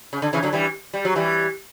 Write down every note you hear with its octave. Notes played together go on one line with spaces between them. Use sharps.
C#3
D3
C#3 E3
D3 F#3
E3 G3
G3
F#3
E3 G3